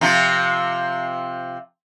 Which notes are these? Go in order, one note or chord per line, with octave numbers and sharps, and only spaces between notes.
C3 F3 F4